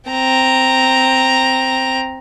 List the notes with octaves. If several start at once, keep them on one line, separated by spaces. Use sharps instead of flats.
C4 A#5